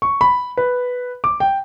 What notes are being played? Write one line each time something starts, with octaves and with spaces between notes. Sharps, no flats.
C#6
B5
B4
D6
G5